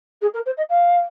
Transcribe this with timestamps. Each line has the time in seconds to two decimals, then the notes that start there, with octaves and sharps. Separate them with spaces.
0.21 G#4
0.33 A#4
0.45 C5
0.57 D#5
0.69 F5